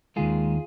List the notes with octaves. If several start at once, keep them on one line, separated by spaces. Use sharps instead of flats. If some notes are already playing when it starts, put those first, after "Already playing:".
D#2 D#3 G#3 F4 G#4